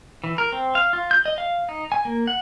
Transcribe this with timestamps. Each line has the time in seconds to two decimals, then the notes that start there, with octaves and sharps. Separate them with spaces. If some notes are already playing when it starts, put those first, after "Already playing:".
0.24 E3
0.38 A#4
0.52 C4
0.75 F5
0.93 F4
1.11 G6
1.26 D#5
1.38 F5
1.69 D#4
1.92 G#5
2.05 A#3
2.27 F#5